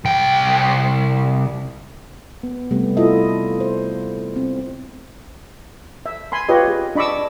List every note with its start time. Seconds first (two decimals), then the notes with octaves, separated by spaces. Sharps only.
0.05 C2 G5
2.43 B3
2.71 C3 G3 A3 B3
2.97 E4 F4 A4 D#5 E5
3.60 C5
4.36 C4
6.06 E5
6.32 G#5 B5 C6
6.49 F4 G4 B4 C#5 D#5
6.68 G#4
6.95 D4 D#5 B5 C#6 D6 E6